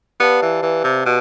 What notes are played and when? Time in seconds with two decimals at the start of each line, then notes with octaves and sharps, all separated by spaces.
0.20 B3 G4 B4 D5 F5 A5
0.42 E3
0.62 E3
0.84 C3
1.05 B2